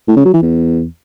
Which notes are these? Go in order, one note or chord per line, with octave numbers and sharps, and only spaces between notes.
A2
C#3
F#3
E3
E2